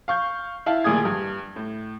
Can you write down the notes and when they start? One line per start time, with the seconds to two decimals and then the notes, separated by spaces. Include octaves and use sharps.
0.08 F5 C#6 G6
0.66 E4 F5 A5
0.84 D#1 D2 A#2 G#4 D#6 G#6
1.05 G2
1.56 A2